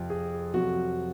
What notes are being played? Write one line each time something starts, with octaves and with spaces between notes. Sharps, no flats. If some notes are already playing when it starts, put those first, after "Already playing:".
Already playing: F2 C3 F3
G#4
F2 C3 F#3 F#4